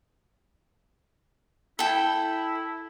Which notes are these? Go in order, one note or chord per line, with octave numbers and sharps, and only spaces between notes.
E4 A4 G5